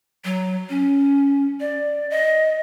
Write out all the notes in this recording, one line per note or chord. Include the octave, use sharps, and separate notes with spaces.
F#3
C#4
D5
D#5